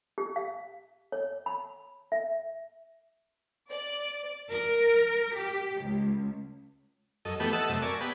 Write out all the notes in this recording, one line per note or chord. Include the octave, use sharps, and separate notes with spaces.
G4
F5
C#5
B5
E5
D5
A#4
G4
C#2
F#2 A4 D#5
E3 A3 B3 G4 A4 B4
A4 D#5 E5 F#5 A5 E6
F#2 C3 A3
A#4 D5 E5 G#5 A5 C#6
B3 G4 G#4 B4